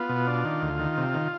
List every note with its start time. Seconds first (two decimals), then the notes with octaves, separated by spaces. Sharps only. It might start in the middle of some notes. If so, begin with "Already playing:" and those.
Already playing: B3 F4
0.09 B2
0.27 D4
0.45 D#3
0.62 D2
0.80 D#3
0.98 C3
1.14 D#3